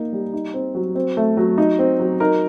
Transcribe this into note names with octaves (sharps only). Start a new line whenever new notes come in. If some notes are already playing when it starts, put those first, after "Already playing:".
Already playing: A#3 D#4
G3
D#4
C4
F#3
C4
A3
F#3
D#4
C4
F#3
D#4 A#4